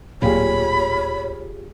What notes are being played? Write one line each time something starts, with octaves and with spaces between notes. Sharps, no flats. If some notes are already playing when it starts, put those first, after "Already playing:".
D1 A#2 F4 G4 G#4 C#5 B5